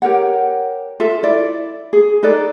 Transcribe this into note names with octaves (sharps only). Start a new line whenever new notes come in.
G4 A#4 C#5 F#5
F4 A4 E5
E4 D5
G#4
D#4 A4 B4 D5